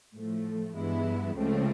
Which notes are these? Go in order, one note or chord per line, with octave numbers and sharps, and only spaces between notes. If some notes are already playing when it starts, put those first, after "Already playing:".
A2 F3 A3
G2 E3 G#3 B3 E4
C#2 C#3 F3 A3 C4